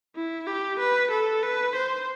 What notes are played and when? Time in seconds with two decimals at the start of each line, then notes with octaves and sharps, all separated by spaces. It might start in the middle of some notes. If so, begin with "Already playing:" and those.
0.15 E4
0.47 G4
0.79 B4
1.11 A4
1.43 B4
1.75 C5